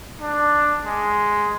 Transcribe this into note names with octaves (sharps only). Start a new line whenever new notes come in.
D4
G#3